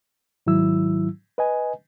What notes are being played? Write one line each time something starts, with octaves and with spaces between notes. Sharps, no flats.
G#2 D#3 F#3 E4 E6
B4 D#5 G#5